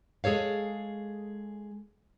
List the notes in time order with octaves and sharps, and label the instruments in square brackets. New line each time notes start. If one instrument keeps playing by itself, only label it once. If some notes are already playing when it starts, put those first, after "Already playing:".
[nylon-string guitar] G#3 G#4 A4 C#5 F5